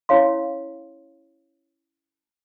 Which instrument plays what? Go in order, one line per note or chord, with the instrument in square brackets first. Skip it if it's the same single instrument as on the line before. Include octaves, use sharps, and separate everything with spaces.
[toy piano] C#4 E4 C#5 F5 C6